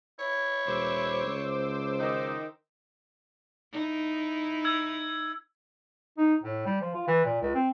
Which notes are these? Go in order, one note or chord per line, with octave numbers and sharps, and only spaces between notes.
E4 C#5
E1 C5 D6 E6
C#2
D#3 D#4
D#4 E4
E6 G#6
D#4
A2
G3
F3
F4
E3
A#2
C#2
C4